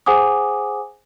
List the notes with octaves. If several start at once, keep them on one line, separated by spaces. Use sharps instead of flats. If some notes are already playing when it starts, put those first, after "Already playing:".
G#4 C5 F#5 G#5 D6 D#6